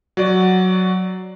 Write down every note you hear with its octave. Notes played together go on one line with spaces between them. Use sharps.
F#3 F#4 D5